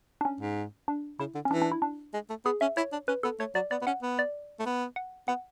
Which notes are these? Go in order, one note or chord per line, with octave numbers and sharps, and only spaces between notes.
D4
C#4
G#2
D4
C#3 E4
D3
C#4
E3 D4
D4
E4
D4
G#3
A3
B3 G#4
C#4 E5
E4 C#5
D4
C#4 B4
B3 A4
A3 C#5
F#3 D5
B3 D5
B3
C#4 F#5
B3
D5
A3
B3
F#5
B3 F#5